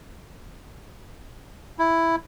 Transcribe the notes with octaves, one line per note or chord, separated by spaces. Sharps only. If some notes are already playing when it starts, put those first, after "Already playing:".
E4